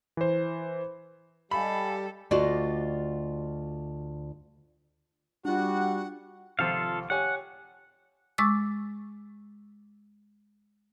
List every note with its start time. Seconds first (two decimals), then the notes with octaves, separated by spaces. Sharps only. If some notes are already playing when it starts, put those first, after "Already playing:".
0.17 E3 C5
1.51 G3 G4 A4 D#5 F5 G#5 B5
2.31 D2 F4 F#4 D5 D#5
5.45 G3 D4 F4 F#4 F#5
6.59 G#1 C3 F3 F4 A4 F5
7.10 G4 C#5 F#5 G#5
8.38 G#3 C#6 D6 E6 A6